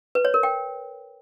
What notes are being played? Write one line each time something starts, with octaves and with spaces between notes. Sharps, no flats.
B4
C#5
A#4
G5